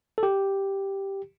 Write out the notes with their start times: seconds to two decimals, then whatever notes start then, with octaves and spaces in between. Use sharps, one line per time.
0.18 A4
0.23 G4